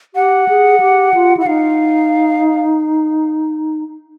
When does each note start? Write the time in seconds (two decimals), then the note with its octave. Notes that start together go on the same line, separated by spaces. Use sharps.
0.14 G4 F#5
0.49 G#4
0.80 G4
1.14 F4
1.37 E4 F#5
1.46 D#4 F5